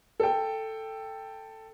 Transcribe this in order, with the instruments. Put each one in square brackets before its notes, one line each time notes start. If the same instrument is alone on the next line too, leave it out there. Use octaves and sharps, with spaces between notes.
[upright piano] A4 G5